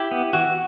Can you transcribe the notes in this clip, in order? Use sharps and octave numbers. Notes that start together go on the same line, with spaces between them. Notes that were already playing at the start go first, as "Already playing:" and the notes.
Already playing: E4 G4
B3
E3 F#4